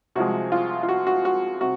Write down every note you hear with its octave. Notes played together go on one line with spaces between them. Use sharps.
C2 C3 F3 G#3 F#4
F4
F4
F#4
F#4
F#4
C3 F#4